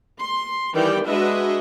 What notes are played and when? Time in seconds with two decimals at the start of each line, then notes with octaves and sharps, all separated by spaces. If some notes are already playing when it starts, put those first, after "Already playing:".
0.19 C6
0.74 D#3 E3 G3 G4 D5 G5
1.07 G#3 D4 F#4 B4 D#5 E5